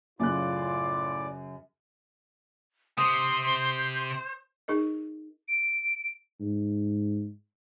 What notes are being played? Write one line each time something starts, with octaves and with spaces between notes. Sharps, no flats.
F#2 A2 C#3 F4 D5 D6 F#6
C3 C5 C6 D#6
D#4 G#4 A#4 D#5
D7
G#2